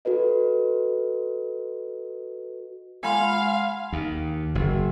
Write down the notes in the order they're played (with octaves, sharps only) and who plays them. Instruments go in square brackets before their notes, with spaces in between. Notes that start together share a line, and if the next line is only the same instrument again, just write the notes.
[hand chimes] F#4 A4 B4 D#5
[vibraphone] G#3 F#5 [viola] F5 [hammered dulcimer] G#5 B5 C6
[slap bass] D#2
F#1